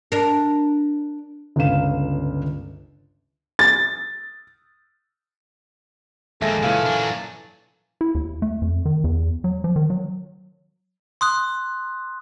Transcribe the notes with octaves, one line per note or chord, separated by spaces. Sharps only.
D4 A#4
G1 C#2 C#3 F5 E7
A6
A#1 D#2 G#3 A#3 A4 E5 G#5 A#6
F#2 A#2 C#3 E3 F5
F#3 D4
E4
D#2
A3
F2
D#3
E2
F#3
F3
D#3
F#3
C6 D#6 F#6